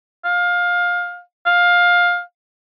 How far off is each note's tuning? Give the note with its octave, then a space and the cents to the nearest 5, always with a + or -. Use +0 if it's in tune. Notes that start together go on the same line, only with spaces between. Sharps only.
F5 +20
F5 +15